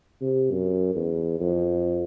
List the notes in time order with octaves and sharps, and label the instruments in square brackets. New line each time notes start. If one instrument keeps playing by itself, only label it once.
[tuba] C3
F#2
E2
F2